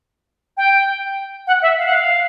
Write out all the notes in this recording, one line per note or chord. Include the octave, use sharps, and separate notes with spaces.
G5
F#5
E5
F5
F#5
F5